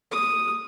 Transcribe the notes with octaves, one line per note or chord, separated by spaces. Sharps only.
D#6